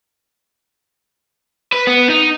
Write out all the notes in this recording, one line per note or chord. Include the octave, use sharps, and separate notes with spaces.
B4
B3
D#4